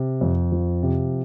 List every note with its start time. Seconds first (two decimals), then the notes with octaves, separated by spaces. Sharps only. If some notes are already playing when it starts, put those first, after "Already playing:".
Already playing: C3
0.21 F2
0.52 F3
0.83 C3